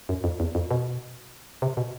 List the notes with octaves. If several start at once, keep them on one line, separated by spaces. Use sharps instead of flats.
F#2
F2
E2
F2
B2
C3
B2